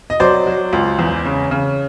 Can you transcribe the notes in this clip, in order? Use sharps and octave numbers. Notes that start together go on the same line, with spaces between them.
D#5
F#3 C5 D5
F#3
C#2
E2
C#3
C#3